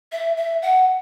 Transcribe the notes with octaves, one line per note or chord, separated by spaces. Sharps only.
E5
E5
F#5